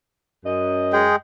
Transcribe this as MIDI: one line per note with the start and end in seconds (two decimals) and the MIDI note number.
0.45 1.14 42
0.45 1.14 75
0.93 1.16 56
0.93 1.16 68
0.93 1.16 79